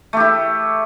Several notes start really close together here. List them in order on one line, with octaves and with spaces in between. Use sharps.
A3 G4 E4